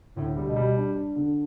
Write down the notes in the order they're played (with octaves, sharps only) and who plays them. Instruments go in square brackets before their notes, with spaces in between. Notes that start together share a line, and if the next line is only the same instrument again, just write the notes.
[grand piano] D2 [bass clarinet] A2
[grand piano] G3
[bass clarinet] B2
[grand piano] G3
D4
D4
D3